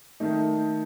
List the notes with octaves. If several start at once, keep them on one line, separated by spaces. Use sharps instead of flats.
D#3 A3 D#4